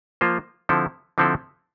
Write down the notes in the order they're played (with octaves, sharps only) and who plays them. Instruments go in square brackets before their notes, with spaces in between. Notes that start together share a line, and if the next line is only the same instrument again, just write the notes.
[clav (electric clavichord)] F3 A#3 F4 C5
D3 F3 C4 E4 A4
D3 F3 C4 E4 A4